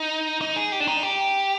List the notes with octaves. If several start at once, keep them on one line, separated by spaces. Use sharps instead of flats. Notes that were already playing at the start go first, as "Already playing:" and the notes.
Already playing: D#4
D#4
G#4
G4
D4
D#4
G4